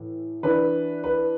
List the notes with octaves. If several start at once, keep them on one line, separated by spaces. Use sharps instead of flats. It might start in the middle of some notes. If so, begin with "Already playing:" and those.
Already playing: A2 E3
E3 D4 B4
B4